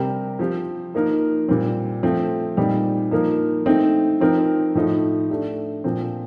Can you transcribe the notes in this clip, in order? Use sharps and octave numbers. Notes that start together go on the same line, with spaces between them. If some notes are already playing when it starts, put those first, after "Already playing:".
Already playing: C3 G3 C4 G4 A#4
F3 C4 G4
F3 A#3 D#4 A#4
A#2 G3 C4
F3 A3 C4
A#2 G3 C4 D#4
F3 A#3 D#4 A#4
A3 C4 D#4
F3 C4 D#4 A#4
A2 F3 A3 D#4
A3 D4 G4
A#2 F3 C4